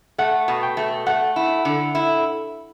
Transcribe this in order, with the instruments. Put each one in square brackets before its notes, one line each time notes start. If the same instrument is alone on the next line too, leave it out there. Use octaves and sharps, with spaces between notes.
[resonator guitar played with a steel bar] A3 [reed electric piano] F#5
[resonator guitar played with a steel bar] B2
[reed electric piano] G5
[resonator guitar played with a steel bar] A3
[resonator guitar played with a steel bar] A3 [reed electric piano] F#5
[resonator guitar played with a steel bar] E4
D3
E4